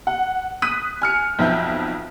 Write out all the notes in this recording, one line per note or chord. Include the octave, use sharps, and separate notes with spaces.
F#5
D#6 F#6 B6 D#7
G#5 F6 C#7
B1 F2 E5 G6